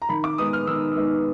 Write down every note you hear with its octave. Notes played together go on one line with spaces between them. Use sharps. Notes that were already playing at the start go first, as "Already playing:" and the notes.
A#5
D#3 B5
D6
G#3 B3 D#4 D#6
F6
D#3 E6
G#3 B3 D#4